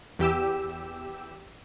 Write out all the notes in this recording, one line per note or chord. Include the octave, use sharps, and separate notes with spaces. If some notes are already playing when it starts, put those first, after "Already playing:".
E2 G4 E6